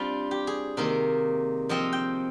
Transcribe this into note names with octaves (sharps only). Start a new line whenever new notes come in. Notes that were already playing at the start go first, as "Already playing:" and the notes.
Already playing: G3 C4 D4 F4
G4
G#4
C3 D#3 A#3 A#4
F3 C4 F4 D#5
G5